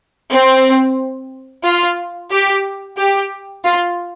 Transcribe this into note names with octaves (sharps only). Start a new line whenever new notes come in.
C4
F4
G4
G4
F4